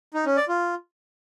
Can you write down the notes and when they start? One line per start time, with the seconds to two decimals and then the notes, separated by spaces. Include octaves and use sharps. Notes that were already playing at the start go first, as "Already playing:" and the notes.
0.14 D#4
0.25 C#4
0.37 D5
0.48 F4